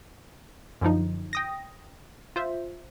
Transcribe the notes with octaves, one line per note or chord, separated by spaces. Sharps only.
F#2 D3 F3 D#4
G5 D#6 A#6
F4 C5 E5